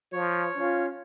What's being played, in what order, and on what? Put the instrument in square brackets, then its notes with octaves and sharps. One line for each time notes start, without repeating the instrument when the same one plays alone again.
[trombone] F3 [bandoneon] C#5
[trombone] C#4 [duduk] F4